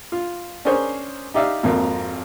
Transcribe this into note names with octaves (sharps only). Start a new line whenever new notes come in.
F4
C#4 D4 G#4 A#4 C5 C#5
D#4 G4 D5 E5 F5
G#1 F2 A#3